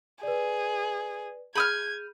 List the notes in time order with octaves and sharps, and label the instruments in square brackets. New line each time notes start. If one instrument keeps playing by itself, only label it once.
[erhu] G#4 [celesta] B4 D5
[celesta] G#4 G6 D#7 [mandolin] B5 D#6 F6 [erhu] G#6